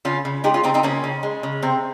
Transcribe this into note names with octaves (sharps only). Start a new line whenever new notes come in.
C#3 C#4 F4
C#3
G#3 D#4 G4
C#4 F4
C#3 C4 D#4
C4 D#4
C#3 A#3 C#4
C#3
G#3
C#3
C3 C4